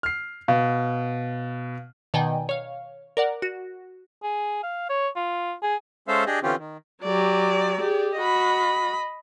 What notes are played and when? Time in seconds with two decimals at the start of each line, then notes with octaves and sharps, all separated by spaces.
0.03 F6 C7
0.48 B2 F5
2.14 B2 D#3 D5 D#5 G5 G#5
2.49 C#5 F5
3.17 A#4 D5 F#5
3.42 F#4
4.23 G#4
4.63 F5
4.89 C#5
5.16 F4
5.63 G#4
6.08 G#3 C#4 A4 C5 E5 F5
6.27 D4 G4 G#4 D#5
6.43 D3 E3 C4 C#4 F4 G4
6.58 D#3
7.03 F#3 G4 D5
7.81 G4 G#4
8.17 F#4 D#5 B5